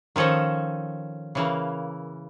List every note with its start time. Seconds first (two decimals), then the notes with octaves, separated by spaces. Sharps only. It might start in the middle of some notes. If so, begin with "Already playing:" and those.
0.16 D#3 F3 C#4 A4 D#5
1.35 C#3 E3 A#3